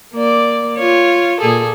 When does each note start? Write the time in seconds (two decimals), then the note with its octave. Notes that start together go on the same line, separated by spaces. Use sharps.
0.14 A#3 D5
0.78 F4 C#5
1.41 A#2 G#4 A4